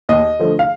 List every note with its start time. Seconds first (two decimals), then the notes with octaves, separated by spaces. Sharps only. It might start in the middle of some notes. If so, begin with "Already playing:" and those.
0.09 D#2 D#5
0.39 D3 F3 A3
0.59 F5